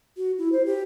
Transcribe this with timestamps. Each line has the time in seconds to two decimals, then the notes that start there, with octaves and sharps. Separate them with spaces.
0.17 F#4
0.38 E4
0.52 C5
0.65 G4